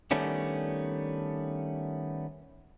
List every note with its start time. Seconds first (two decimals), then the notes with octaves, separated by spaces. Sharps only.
0.11 D#3 G3 A3 B3 C#4 D4